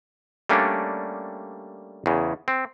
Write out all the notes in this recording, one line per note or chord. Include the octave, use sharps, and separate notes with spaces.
G3 A3 A#3 C#4 D4
E2 C#3
C4